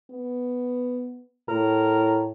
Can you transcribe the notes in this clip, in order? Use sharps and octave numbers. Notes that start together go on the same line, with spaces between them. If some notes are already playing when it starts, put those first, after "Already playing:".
B3
A2 A#4